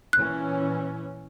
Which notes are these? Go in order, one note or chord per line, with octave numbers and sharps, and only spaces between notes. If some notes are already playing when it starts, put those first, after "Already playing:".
A#2 E3 C#4 F#6